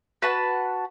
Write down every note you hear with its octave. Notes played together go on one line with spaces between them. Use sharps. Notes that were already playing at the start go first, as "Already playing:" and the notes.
F#4 B4 F#5 A5